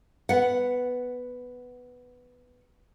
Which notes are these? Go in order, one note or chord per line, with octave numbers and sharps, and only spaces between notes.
B3 F#5